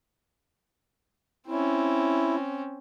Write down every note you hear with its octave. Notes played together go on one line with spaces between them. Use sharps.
C4 C#4 E4